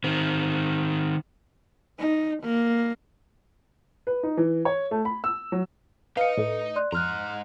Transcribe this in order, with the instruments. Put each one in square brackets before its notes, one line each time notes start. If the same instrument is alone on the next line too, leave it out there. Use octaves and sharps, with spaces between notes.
[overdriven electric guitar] D#3 C4
[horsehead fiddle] D#4
A#3
[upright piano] B4
D#4
E3
C#5
A3
B5
E6
F#3
[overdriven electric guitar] D#4 D#5 [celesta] B4 C#7 [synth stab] F5
[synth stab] A2 A3
[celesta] D5 C6 F#6
[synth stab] F2 [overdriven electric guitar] G#2 A#5 [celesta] C6 F6 F#6